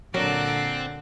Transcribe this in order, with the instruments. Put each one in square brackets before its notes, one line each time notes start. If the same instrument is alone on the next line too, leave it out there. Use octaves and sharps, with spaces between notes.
[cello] A#2 D3 [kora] F#3 A#4 [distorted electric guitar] C4 [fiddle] D5 F#6